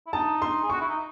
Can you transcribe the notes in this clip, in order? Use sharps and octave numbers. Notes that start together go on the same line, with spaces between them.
E4
D#4 A5
C6
G#4
F#4 C#6
E4
D#4